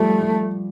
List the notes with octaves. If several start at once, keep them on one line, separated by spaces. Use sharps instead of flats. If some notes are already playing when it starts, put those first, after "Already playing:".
Already playing: F3 G3 A3
G3